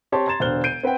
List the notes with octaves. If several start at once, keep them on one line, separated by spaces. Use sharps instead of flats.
C4 G4 C#5 A5 C6
A#5 C6 G#6 A6 E7
E1 D3 C5 F6 F#6 G7
G6 C7 D7 D#7
C4 B4 F#5 G5